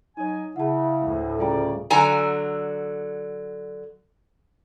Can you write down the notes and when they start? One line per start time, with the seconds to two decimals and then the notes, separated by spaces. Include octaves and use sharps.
0.17 F#3 D#4 C#5 D#5 G#5
0.56 C#3 E4 F#5 A5
1.04 D2 A2
1.39 C#3 G3 F4 D5 G5 A#5
1.90 D3 F#3 G#5 A#5